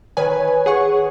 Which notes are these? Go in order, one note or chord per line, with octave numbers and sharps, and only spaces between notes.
D#3 B4 C#5 G#5
G#4 F#5 C#6